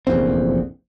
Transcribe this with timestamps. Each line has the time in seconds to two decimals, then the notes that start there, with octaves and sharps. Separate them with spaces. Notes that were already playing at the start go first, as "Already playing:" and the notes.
0.07 F1 A#1 E2 C4